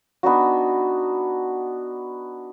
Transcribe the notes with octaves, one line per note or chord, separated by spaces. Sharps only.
B3 D4 D#4 F#4